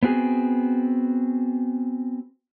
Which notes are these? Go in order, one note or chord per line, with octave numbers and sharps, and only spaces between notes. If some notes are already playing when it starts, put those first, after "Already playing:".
B3 C4 F#4 G#4